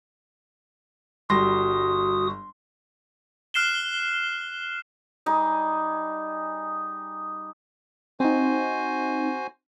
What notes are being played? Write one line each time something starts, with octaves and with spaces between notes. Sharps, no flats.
G1 G3 F#4 C6 D#6 A#6
F6 F#6 C7 E7 G7
G3 D#4 G#4
C4 D#4 F#4 C5 G#5